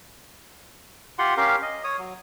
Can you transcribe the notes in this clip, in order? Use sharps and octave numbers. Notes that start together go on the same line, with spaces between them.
F4 G4 F#5 C6
C#4 G4 A#4 F5
D#5
C#5 D#6
F#3